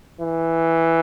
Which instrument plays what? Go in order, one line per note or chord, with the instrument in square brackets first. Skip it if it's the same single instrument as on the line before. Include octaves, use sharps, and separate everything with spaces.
[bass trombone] E3